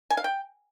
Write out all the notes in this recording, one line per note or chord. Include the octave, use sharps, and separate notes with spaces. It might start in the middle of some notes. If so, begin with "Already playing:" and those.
G#5
F5
G5